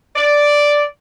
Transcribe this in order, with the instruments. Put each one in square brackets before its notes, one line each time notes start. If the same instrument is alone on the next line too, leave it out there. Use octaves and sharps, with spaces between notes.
[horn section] D5